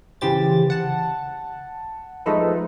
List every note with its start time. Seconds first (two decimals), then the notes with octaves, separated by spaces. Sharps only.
0.21 C#3 E3 G4 C5 A6
0.70 F#5 A5
2.26 F3 G#3 A3 D#4 A4 B4